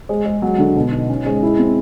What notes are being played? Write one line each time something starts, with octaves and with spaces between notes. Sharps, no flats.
G#3
G#3
F#3
D3
B2
D#4
C#4
G#3
E4
C4